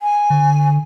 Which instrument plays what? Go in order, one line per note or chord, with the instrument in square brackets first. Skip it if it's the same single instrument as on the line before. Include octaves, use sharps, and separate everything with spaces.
[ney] G#5
[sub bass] D3